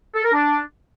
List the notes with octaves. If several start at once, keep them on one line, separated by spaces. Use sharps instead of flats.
A4
A#4
D4